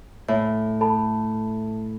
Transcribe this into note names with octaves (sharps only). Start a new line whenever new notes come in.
A2 C#5
A4 A5 B5